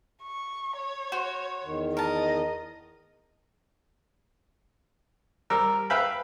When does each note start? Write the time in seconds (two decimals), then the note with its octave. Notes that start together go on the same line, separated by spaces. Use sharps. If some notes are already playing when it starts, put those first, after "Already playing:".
0.22 C#6
0.77 C#5
1.12 F#4 C5
1.64 E2 D#3
1.97 A#4 D#5 A5
5.50 G3 A#4 E6
5.90 B4 E5 F5 G5 B5